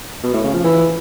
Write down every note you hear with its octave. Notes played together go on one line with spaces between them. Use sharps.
B2
A2
C#3
F3
E3